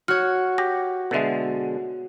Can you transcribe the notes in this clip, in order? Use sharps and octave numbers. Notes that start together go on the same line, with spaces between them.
F#4 C#5 F#5 F6
G4 A#6
B2 D3 G#3 A4 E5